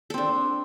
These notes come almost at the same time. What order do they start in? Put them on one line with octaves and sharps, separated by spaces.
A4 C4 D4